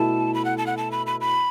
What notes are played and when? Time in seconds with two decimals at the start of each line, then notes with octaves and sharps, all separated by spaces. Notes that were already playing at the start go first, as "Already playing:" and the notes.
Already playing: B2 A3 E4 A4 A5
0.34 B5
0.45 F#5
0.58 A5
0.67 F#5
0.77 A5
0.92 B5
1.06 B5
1.20 B5